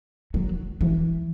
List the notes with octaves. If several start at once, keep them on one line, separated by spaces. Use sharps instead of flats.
F#3
E3